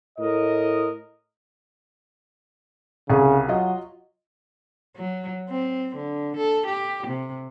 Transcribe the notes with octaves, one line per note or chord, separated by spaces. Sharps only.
A2 A#4 D#5
C2 C#3 G#4
F#3 F4 D#5
F#3
C4
D3
A4
G4
C3